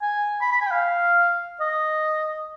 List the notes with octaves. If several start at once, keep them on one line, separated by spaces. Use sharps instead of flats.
G#5
B5
B5
G#5
G5
F5
D#5